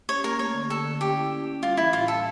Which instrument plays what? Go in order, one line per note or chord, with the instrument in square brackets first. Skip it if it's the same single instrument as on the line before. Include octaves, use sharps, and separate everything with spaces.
[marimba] C#4 [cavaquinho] C#5
[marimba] A#3 [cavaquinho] A#4
[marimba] A3 [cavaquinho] C#5
[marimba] D3
[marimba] D3 [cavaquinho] A4
[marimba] D3
[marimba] C#4 [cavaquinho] G4
[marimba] E4
C#4
C#4
[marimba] G3 [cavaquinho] F4
[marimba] E3 [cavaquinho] E4
[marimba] A2 [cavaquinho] F4
[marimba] G3 [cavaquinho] A4